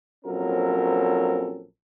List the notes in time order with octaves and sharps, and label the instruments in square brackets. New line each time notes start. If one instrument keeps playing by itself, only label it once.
[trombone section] A#1 F#3 C4 C#4 A4 A#4